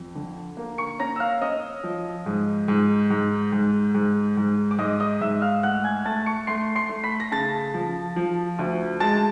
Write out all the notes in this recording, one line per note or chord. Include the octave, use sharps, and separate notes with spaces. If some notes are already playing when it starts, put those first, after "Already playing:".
Already playing: F2
D3
A#3
C#6 C#7
C#4 A#5 A#6
E6
F5 F6
C#4 D#5 D#6
F3
G#2
G#2
G#2
G#2
G#2
G#2
D6
G#2 D#5 D#6
D#5 D#6
G#2 E5 E6
F5 F6
A3 F#5 F#6
G#5 G#6
A3 A5 A6
C#6 C#7
A3 C6 C7
C6 C7
A3
B5 B6
A#6
C#3 A5 A6
F3
F3
D2
G#3 A5 A6